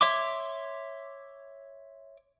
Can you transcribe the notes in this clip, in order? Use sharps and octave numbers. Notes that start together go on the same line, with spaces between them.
C#5 E5 C6 D6